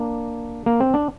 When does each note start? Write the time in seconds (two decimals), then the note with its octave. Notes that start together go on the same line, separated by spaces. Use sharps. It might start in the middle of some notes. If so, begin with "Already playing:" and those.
Already playing: A#3 D4
0.66 A#3
0.80 C4
0.94 D4